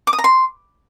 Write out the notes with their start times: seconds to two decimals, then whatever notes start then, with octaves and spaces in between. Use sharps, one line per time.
0.07 D6
0.13 D#6
0.18 A#5
0.24 C6